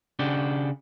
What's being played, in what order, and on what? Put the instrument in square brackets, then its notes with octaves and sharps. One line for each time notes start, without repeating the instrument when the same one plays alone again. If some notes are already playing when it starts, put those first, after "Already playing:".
[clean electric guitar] C#3 D4 F#4 G4